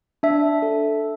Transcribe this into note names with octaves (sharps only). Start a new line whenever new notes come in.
D4 E5
A4